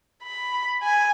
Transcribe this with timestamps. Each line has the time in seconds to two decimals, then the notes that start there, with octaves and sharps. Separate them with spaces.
0.24 B5
0.83 G#5